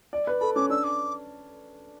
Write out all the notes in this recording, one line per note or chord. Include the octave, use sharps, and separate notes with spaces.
D5
B4
A4 B5
C#4 D6
D4 E6
D6